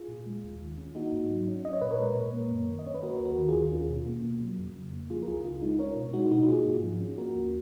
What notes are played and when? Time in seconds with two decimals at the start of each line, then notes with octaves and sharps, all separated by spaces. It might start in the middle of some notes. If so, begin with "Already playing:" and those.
Already playing: F4 G#4
0.08 A#2
0.26 G#3
0.44 D#2
0.61 D#3
0.78 C#4
0.95 A#3 D#4 F#4
1.12 G#2
1.30 F#3
1.48 C#4
1.64 C#4 D#5
1.73 C#5
1.81 A#2 B4
1.91 A#4 C#5
2.00 G#3
2.16 A#2
2.33 A#3
2.51 F#2
2.68 D#3
2.79 D#5
2.85 C#4 C#5
2.94 B4
3.02 A#3 F#4 A#4
3.20 D#2
3.25 F#4 A#4
3.38 D#3
3.48 F4 G#4
3.55 D#2
3.72 C#4
3.89 B2
4.06 A#3
4.24 B2
4.42 F#3
4.58 F2
4.76 C#3
4.93 A#3
5.10 F3 F4 G#4
5.22 A#4
5.27 C#2 F4 G#4
5.44 C#3 F4
5.62 G#3 D#4
5.79 C#4 A#4 C#5
5.96 B2
6.13 G#3 D#4 F#4
6.31 B2 D#4 F#4
6.48 A#3 F4 G#4
6.66 G#2
6.83 F3
7.00 C#4
7.18 A#3 F#4 A#4
7.35 D#2